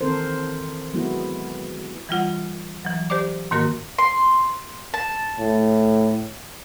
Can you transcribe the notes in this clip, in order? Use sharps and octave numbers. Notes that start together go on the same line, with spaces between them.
D#3 E3 C4 A4 A#4 C5
F#3 G#3 B3 E4 F#4
E3 G3 F4 F#5
E3 F#3
G4 C5 D5 D6
G#2 D#3 A#3 F#4 A#4 C6
C6
A5
A2